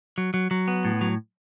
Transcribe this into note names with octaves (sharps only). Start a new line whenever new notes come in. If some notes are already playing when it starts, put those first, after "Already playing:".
F#3
F#3
F#3
B3
A2
F#3